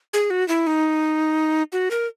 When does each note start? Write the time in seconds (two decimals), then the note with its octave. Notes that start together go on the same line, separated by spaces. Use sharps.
0.13 G#4
0.30 F#4
0.48 E4
0.67 D#4
1.73 F#4
1.91 A#4